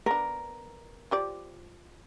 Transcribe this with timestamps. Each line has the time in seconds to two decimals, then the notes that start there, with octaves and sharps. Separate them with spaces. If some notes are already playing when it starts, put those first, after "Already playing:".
0.06 B3 D4 A#4
1.11 F3 G4 D5